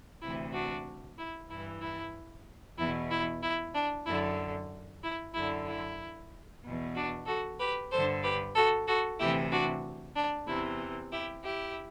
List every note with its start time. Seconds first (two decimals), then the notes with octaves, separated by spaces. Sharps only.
0.22 D2 C3 E3 E4
0.53 D4 F#4
1.19 E4
1.50 G2 E3 E4
1.82 E4
2.78 E2 B2 E4
3.11 E4
3.43 E4
3.75 D4
4.06 F#2 D3 E4
5.04 E4
5.34 F#2 D3 E4
5.67 E4
6.64 E2 B2
6.95 D4 F#4
7.27 F#4 A4
7.60 G4 B4
7.92 G2 D3 A4 C5
8.23 G4 B4
8.55 F#4 A4
8.87 F#4 A4
9.19 D2 C3 E3 E4 G4
9.52 D4 F#4
10.16 D4
10.48 E2 C3 E3 E4
11.12 E4 G4
11.44 E4 G4